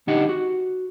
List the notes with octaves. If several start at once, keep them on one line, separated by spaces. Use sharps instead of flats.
D3 D#4 G4 D#5 F#5
F#4